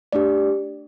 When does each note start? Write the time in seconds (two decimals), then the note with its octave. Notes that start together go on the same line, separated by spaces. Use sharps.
0.13 A3 D4 G4 D5